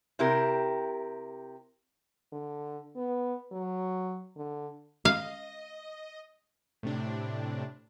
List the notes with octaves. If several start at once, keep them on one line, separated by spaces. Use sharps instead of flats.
C3 E4 G4 A#4
D3
B3
F#3
D3
D#5 F5
A2 C3 D4